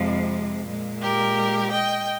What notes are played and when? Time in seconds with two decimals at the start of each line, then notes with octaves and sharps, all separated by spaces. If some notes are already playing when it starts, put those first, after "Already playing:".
Already playing: F2 C3 F3 G#3
0.66 A#2 G#3
1.01 G4 A#4
1.71 D#5 G5